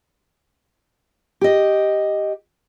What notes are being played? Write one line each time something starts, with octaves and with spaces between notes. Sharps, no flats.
G4 D#5